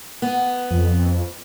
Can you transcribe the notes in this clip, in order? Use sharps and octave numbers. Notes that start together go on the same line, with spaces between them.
B3
F2